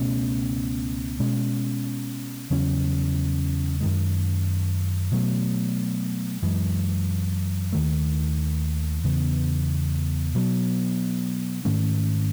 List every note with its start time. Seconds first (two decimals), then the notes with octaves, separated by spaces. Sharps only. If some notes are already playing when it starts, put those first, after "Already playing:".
Already playing: C#2 B2 A3 C#4
1.20 B2 G#3 C#4
2.50 E2 C#3 F#3 C#4
3.81 F#2 D#3 G#3
5.12 B2 F#3 A3
6.42 F#2 E3 G#3
7.73 D#2 D#3 A3
9.04 E2 C#3 E3 B3
10.35 B2 F#3 B3
11.65 G#2 D#3 A3 C#4